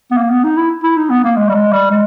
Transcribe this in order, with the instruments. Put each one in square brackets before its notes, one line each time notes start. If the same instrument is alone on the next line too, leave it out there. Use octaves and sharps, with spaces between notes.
[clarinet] B3
A#3
B3
D#4
E4
E4
D#4
B3
A#3
G#3
G3
G#3
G3
G#3